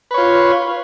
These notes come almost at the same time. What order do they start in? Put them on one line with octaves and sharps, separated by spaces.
B4 C#5 F4